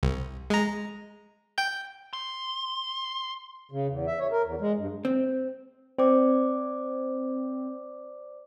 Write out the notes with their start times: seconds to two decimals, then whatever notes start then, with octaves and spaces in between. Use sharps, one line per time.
0.03 C2
0.50 G#3 A#5
1.58 G5 G6
2.13 C6
3.71 C#3
3.87 E2
4.07 E5
4.19 C#5
4.31 A#4
4.44 E2
4.61 G#3
4.77 G2
5.05 C4
5.98 C4 C5 D5 D6